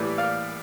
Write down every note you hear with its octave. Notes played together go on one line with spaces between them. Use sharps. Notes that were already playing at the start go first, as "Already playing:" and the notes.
Already playing: A2 E3 G3 B4 D5
D5 F5